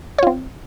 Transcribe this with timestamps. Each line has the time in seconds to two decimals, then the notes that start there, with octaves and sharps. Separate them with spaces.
0.18 C#5
0.23 F4
0.27 C4